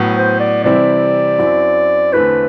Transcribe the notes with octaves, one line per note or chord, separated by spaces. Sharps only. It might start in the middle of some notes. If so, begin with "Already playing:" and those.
Already playing: A2 F#3 B3
C5
D5
C3 E3 G3 C4 E4 D5
F#2 F#3 C4 E4
E2 D3 A3 C4 E4 B4